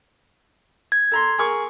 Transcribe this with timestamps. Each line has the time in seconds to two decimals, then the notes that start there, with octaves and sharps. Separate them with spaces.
0.92 G#6
1.11 A4 A#5 C6
1.38 G#4 A#4 C#6